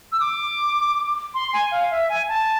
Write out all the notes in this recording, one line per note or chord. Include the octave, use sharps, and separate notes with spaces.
E6
D6
C6
G#5
F5
E5
G#5
A5